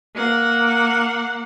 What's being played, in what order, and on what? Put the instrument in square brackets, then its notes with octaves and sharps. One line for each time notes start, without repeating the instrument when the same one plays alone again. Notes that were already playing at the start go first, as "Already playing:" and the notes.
[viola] A#3 F#5